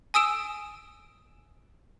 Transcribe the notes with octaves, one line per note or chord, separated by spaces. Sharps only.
G#5 D#6 E6 D7 E7